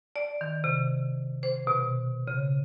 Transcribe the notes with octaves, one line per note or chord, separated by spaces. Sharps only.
D5
D#3
C3
C5
B2
C#3